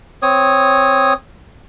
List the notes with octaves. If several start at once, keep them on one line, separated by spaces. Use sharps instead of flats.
C4 C#5 D#6